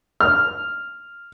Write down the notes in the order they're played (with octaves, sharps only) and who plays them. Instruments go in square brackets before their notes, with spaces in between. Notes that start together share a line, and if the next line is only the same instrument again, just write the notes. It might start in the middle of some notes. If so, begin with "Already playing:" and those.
[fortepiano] F6